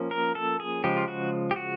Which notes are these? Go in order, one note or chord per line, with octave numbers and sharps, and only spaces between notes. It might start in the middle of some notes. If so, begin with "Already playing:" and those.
Already playing: F3 A#3 C#4
A#4
A4
G#4
C#3 F3 G#3 G4
F4
F#4
G4
F#4